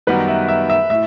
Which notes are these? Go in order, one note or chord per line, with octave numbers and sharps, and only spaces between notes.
F#2 D#3 G3 B3 F#4 B4
E5
E5
E5
A2 E5